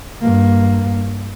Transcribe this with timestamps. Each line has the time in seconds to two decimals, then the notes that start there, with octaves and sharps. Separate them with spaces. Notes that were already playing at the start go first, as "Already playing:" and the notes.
0.22 G2 A#3